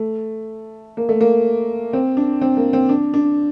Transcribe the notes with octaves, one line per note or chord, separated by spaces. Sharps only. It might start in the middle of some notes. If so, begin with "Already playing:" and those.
Already playing: A3
A#3
A3
A#3
C4
D4
C4
A#3
C4
D4
D4